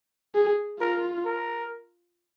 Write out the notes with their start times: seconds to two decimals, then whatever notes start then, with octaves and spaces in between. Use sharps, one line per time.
0.35 G#4
0.80 F4 A#4
1.26 A#4